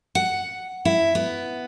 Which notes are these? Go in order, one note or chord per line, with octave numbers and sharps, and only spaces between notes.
F#5
E4
B3